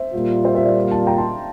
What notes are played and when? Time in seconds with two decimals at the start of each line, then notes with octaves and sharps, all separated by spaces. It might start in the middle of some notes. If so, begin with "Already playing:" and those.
Already playing: C5 E5
0.13 A#2 G3 A#3 F4
0.44 C5 E5
0.55 C5 E5
0.65 D5 F5
0.91 F5 A5
1.07 G5 A#5
1.18 A5 C6